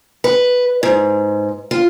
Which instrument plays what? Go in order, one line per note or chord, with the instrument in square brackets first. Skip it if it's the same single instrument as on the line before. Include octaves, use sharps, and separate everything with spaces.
[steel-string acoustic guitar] B4
G#2
F4